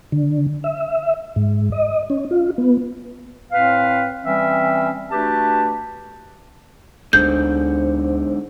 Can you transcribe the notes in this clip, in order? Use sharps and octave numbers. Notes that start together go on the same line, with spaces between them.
D3
E5
G#2
D#5
C#4
F4
B3
A2 C4 B4 F5
E3 G3 C4 C#4 E5
A3 D4 F#4 G4 B4 A5
D2 G#2 D3 C5 G6